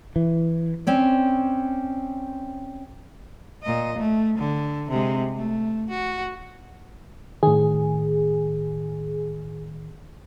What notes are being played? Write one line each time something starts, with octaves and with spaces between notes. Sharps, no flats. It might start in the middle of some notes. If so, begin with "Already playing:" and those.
E3
C4 C#4 D5
A#2 D#5
A3
D3
C3 G#3
A3
F#4
A2 D#3 G#4